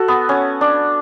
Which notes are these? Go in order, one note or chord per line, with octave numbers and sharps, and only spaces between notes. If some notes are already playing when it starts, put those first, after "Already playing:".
Already playing: F#4 A4
B3
C#4
D4